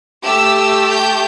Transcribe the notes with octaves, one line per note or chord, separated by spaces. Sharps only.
A3 G4 E6
E6
G6